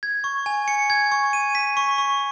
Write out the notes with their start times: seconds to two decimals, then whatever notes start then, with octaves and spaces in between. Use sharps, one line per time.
0.03 G#6
0.24 C#6
0.46 G#5
0.68 C#7
0.90 G#6
1.11 C#6
1.33 D#7
1.55 B6
1.77 C#6
1.98 C#6